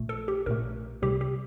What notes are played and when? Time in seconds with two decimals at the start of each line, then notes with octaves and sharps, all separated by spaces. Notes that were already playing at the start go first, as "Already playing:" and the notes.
Already playing: A#1 A#2 A3
0.09 A4
0.28 G4
0.46 A#1 A#2 A3 A#4
1.02 C2 C3 G3 G4
1.21 G4